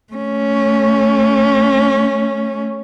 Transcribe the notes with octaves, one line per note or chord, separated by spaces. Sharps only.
A3 C#4